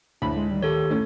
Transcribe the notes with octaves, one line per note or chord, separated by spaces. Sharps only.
D2 A2 E4 B5
G#3
D#3 G3
D#3 G4 A4 C#5
A2 C#4